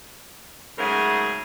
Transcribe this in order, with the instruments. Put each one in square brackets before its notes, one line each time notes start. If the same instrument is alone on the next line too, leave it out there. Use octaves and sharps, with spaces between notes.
[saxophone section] G#2 C#3 F#3 A3 G#4 A#4